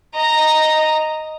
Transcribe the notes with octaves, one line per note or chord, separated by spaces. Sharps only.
D#5 A#5